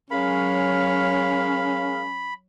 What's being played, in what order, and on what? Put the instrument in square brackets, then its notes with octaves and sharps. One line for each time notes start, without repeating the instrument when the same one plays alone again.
[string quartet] F#3 C#5 [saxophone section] G#3 A#4 F5 [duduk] C#4 [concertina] B5